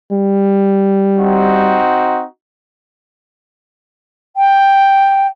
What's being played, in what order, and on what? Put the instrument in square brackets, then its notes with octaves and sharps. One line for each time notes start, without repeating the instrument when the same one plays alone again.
[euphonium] G3
[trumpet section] C4 D#4 F#4
[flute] G5